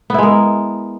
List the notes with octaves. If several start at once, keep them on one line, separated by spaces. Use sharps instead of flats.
G#3 B3 E4 A#4